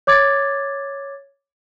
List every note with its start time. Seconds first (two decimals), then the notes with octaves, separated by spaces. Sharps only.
0.07 C#5 D6 G#6 A6